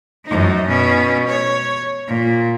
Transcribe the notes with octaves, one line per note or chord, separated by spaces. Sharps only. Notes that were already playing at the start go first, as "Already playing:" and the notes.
F#2 D#4
B2 C#4
C#5
A#2